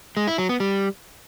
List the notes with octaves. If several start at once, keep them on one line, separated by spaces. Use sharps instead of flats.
G#3
E4
F#3
B3
G3